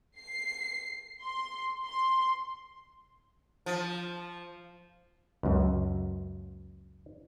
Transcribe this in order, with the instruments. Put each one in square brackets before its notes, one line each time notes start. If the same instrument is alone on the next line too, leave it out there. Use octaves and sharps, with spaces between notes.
[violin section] C7
C6
C6
[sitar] F3
[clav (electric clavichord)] C#2 F#2